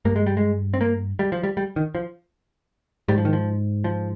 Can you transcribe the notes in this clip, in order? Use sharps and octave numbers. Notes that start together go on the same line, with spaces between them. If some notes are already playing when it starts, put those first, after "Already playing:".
G2 A#3
G#3
G3
G#3
C4
A#3
G3
F3
G3
G3
D#3
F3
G#2 G3
F3
D#3
F3
F3